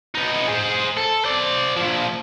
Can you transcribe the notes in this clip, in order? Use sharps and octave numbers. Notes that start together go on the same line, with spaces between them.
B3 D#4
G#4 C5
A4
C5 D5
A#2 F3